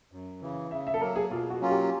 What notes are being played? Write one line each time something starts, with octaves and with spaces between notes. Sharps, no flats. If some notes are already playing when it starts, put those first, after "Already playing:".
F#2
C#3 E3
C#3 E5
E5
A4
F#3 A#3 A#4
G#4
B2 F4
F#4
F#3 A#3 C#4 F4
G4